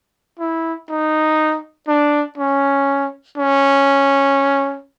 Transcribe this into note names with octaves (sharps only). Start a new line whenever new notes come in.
E4
D#4
D4
C#4
C#4